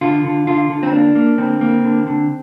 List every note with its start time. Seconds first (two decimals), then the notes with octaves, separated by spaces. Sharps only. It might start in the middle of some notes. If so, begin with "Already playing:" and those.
0.01 D3 F4
0.24 D3
0.47 D3 F4
0.70 D3
0.83 C4
0.92 A#3 D4
1.15 A#3
1.38 D3 C4
1.61 A#3
1.84 D3
2.07 D3